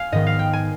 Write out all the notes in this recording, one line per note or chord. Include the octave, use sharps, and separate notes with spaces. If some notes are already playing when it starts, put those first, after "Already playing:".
Already playing: F5 G#5
G#2 D#3 B3 D#5
F5
G5
G#5